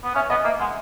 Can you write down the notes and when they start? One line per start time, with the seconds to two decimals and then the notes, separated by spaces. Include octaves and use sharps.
0.04 B3
0.15 C#4 E5
0.30 B3 D#5
0.45 A#3 E5
0.59 G#3 F#5